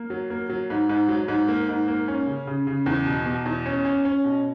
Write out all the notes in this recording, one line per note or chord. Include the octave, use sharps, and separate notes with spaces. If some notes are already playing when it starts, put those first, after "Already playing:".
Already playing: A#3
F#3
A#3
F#3
G#2
G#2
F#3
G#2
A#3
G#2
A#3
C#4
C#3
C#3
C#3
E2
B2
B2
E2
C#4
C#4
C#4
B2